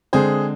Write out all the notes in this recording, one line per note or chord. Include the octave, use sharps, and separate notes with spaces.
D3 G#3 C4 G#4 C5